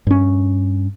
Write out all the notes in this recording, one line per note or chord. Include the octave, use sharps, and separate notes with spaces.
G2 C#4